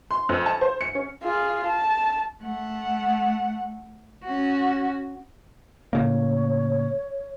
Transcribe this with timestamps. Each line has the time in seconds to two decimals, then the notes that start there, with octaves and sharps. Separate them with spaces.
0.11 C6
0.29 F2
0.46 A5
0.61 C5
0.81 C#7
0.95 C#4
1.23 F4 G#4
1.66 A5
2.42 A3 F#5
4.24 C#4 F#4
5.93 A2 C#3 A#3 C#5